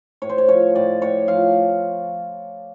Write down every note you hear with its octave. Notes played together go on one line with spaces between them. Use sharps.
A2 C#5
C5
C#5
F3 C#5
A2 D5
A2 C#5
F3 F5